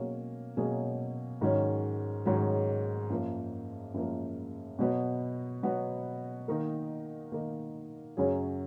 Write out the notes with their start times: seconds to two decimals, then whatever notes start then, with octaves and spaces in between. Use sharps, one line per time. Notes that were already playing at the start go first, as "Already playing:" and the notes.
Already playing: B2 F#3 A#3 C#4 G#4
0.57 B2 F#3 A#3 C#4 G#4
1.41 G#2 D#3 F#3 C#4
2.25 G#2 D#3 F#3 C#4
3.10 F#2 F3 A#3
3.94 F#2 F3 A#3
4.79 B2 F#3 B3 F#4
5.63 B2 F#3 B3 F#4
6.48 D#3 A#3 D#4 A#4
7.32 D#3 A#3 D#4 A#4
8.17 F#2 C#3 F#3 C#4 G#4